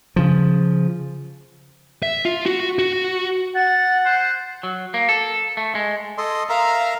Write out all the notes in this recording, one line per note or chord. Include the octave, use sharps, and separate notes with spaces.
C#3 F3
E5
F4
F#4
F#4
F#5 A6
C5 F#6
F#3
A#3
A4
A3
G#3
A4 D#5 C6
A#4 E5 F5 A#5